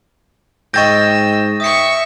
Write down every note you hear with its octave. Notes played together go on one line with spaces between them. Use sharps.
G#2 D#5 G5 C#6 E6 G6 A6 A#6
E5 C#6 D#6 C#7